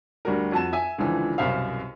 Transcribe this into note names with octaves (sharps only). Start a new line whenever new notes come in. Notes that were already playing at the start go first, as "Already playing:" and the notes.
D2 G3 F#4 A#4
F2 F#4 A5 E7
E5 G#5
C#2 D3 E3 F3
C2 F#2 B2 C5 E5 F5